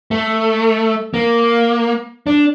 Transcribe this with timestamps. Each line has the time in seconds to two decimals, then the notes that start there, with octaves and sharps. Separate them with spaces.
0.11 A3
1.14 A#3
2.27 D4